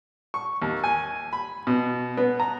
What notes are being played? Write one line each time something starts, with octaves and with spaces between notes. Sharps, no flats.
C#6
D#2
G#5
B5
B2
B3
A#5